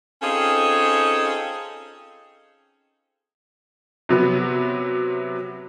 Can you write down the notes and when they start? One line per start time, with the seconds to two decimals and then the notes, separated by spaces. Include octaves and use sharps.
0.22 C4 C#4 D#4 F4 G#4 A4
4.09 C3 F#3 B3